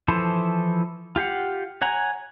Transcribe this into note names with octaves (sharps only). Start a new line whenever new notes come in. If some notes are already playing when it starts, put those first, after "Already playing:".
E3 F3 E4 A4 C5
F4 G4 F5 F#5
C#5 F#5 G#5 A#5